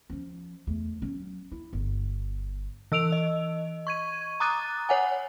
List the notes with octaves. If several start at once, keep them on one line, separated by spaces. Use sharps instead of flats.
F3 C#4
E2 A3
F#3 C#4
E4
G1
E3 E6 D7 F7
D#5
C#6 G#6 D#7
A#5 D6 D#6 F#6 A6 D#7
C#5 F#5 G#5